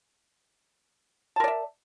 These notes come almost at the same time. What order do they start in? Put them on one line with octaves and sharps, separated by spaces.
A5 A#4 D5 E5